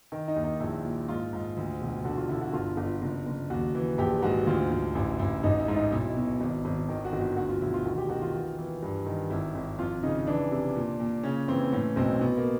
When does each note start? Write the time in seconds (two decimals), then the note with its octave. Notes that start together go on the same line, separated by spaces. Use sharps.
0.12 D#3
0.28 D#4
0.36 D#2
0.44 D#4
0.60 A#1 E4
0.85 A#2
1.08 G#2 F4
1.33 G#2
1.57 D2
1.81 E1
2.05 D3 F#4
2.17 F4
2.29 D3 E4
2.41 F#4
2.53 G1 F4
2.77 G1
3.02 F#1
3.27 F#1
3.50 D#2 F#4
3.75 E3
3.98 A#1 G4
4.22 G#2 F#4
4.47 D2 F4
4.71 D2
4.95 A1 E4
5.19 A1 E4
5.43 A1 D#4
5.60 E4
5.68 G#2
5.76 D#4
5.92 B1 E4
6.16 B2
6.41 G#1
6.65 G#1
6.89 D#3
7.05 F#4
7.13 G1
7.21 F#4
7.37 D2 F#4
7.49 F4
7.61 E1 E4
7.74 F4
7.85 D#3 F#4
7.98 G4
8.09 D#3 F#4
8.22 F4
8.34 E3
8.58 E3
8.82 G2
9.06 D#3
9.30 G#1 E4
9.55 G#1
9.78 F2 F4
10.03 C#3 D#4
10.27 E3 D4
10.52 C3
10.75 A#2
11.00 A#2
11.23 C#3 C#4
11.48 E3 C4
11.72 A2 C#4
11.96 B1 C4
12.21 B2 B3
12.37 A#3